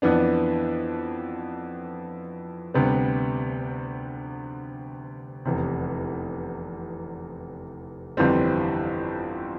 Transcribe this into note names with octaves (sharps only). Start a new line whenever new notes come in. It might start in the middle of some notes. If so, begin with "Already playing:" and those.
F2 E3 B3 D4
D2 C3 G3 B3
F1 E2 C3
G1 F2 E3 G3 C4